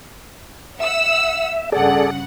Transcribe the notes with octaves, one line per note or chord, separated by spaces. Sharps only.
E5 F#5 E6
G2 C#3 G#4 A4 D5 F#5